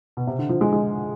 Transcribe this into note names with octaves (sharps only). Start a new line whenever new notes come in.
B2
C3
D3
F3
G#3
G#3